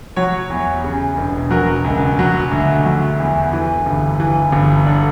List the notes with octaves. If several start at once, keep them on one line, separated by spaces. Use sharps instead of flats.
F#3 C#5
E2
C#3
E1
F#3 A#4
C#2
F#3
D2
F#3
E2
E3
G1
E3
G1
D3 D4